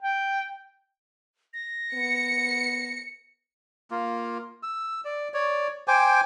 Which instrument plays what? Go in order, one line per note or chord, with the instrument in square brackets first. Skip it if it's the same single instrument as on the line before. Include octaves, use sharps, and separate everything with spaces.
[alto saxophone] G5
[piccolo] A#6
[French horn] B3 [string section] C#7
[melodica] A#3 F4
E6
D5
C#5 D5
C5 G5 G#5 D6